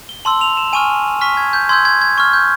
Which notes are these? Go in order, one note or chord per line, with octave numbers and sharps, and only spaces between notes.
G7
A5 C6 E6 F#7
F7
E7
G#5 C#6 F6 D#7
C#6 F6 B6
G#6
G6
C6 E6 G6 G#6
G#6
G#6
C#6 F6 G#6
G6